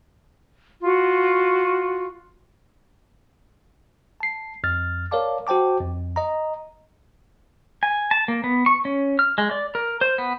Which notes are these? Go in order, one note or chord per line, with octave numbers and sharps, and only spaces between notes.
F4 F#4
A5 C7
F2 F6 A6
A#4 C#5 D5 F5 A5 D6
F#4 C5 G5 A5 D6
F2
D#5 A#5
G#5
A5
A#3
B3
C#6
C#4
F6
G#3
D5
A#4
C5
B3